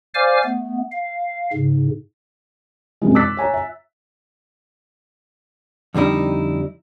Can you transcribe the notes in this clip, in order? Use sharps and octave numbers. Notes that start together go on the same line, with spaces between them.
C5 D5 F5 G#5 D6 F6
A3 B3
F5
G#2 C#3
F#2 C3 E3 G#3
D6 E6 F#6 A6 B6
C#5 G#5 A#5
E5
F2 D3 G3 D#4 E4